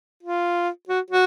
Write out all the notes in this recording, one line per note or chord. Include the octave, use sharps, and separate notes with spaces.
F4
F#4
F#4